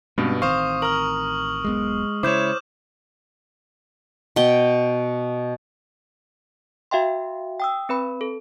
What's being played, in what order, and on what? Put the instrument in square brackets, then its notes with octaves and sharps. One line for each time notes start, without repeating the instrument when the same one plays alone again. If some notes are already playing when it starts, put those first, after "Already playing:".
[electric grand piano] G2 B2 [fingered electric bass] G#3 C4 C#4
[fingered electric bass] A1 D#3 C4 [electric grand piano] C5 F5 [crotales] C#6 D#6
[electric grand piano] A#4 A#5 [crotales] F6 F#7
[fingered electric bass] E1 B1 B3 [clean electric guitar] G#3
[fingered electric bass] C#3 G#3 [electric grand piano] E4 C#5 [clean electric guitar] C5 [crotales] D6 G6 E7
[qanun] B2 G5
[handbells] F#4 E5 F5 G5 C6
G5 D#6 E6
C4 B4 B5
A4